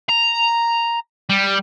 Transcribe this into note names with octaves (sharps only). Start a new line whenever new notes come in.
A#5
G3